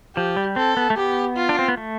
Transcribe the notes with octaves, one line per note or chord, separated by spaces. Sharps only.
F3 G4
G3
C4 A4
B3
A3
B3 G4
F4
D4
C4
B3
A3